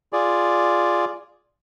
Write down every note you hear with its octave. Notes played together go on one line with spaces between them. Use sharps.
F4 G#4 D5